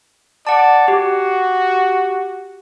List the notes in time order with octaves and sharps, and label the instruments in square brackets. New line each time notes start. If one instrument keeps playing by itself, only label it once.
[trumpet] D5 [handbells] F#5 A5
[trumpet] F#4 [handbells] G4